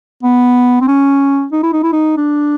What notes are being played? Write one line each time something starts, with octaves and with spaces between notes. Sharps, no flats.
B3
C4
C#4
D#4
E4
D#4
E4
D#4
D4